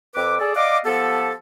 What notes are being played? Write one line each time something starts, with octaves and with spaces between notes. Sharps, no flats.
F2 C4 B4 D6
G#4 A4 D5
D5 D#5 F5 F#5 D6
F3 B3 G4 A4